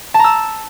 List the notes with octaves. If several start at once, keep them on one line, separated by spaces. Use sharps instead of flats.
A5 A#5 E6